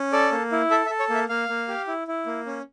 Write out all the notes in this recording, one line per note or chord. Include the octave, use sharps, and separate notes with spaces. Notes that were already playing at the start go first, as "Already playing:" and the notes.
Already playing: C#4
A4 D5
A#3
E4
A4 E5
E5
A4
C#5
A#3 E5
A#3 F5
A#3
G4
E4
E4
A#3
C#4